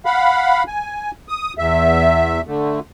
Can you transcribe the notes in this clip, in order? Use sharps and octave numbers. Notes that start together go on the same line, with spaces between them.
F5 F#5 B5
G#5
D#6
E2 E5
D3 A3